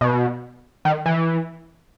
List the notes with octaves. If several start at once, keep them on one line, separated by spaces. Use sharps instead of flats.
B2
D#3
E3